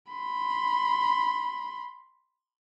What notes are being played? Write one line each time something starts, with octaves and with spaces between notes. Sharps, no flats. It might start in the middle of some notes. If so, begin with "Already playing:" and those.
B5 C6